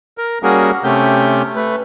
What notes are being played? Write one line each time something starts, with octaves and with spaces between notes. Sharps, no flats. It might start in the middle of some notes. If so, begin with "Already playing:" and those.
A#4
G3 A#3 C#4 F#4 G#4 A#4
C3 A3 C#4 G4 G6
A3 B4